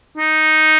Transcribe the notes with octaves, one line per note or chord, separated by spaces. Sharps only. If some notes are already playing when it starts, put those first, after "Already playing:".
D#4